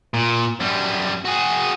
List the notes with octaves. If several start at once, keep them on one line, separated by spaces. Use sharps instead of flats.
A#2
F#2 G3
F#4 G#4